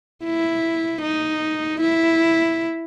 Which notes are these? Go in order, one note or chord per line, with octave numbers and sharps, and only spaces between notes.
E4
D#4
E4